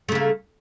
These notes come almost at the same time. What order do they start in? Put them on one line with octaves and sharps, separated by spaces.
A3 C#3 A#3